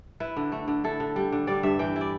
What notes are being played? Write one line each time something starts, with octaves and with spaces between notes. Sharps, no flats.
E4 B4
D3
A3
D3
E4 A4
D3
G3
D3
G3 D5
G2 E5
E3 G5
E4
D5